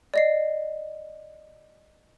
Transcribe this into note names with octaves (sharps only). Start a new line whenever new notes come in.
D5 D#5 C7